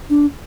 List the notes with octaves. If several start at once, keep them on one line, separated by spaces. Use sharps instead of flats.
D4